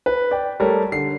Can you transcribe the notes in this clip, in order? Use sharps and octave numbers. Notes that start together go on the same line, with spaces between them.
B4
D5 G5
G3 A3 A#4 C#5
D3 C7